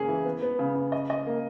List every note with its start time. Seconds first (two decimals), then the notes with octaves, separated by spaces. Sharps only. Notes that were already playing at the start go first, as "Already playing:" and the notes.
Already playing: C#3 A#3 C#4 G#4
0.08 E3
0.26 B3
0.42 B3
0.59 C#3
0.76 C#3
0.92 D#5
1.10 D#5
1.27 A#3